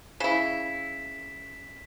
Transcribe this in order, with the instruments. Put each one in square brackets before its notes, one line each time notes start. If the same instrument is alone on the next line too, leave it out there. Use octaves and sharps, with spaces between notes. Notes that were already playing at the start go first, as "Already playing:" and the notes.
[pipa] C#3 E4 [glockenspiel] B6 E7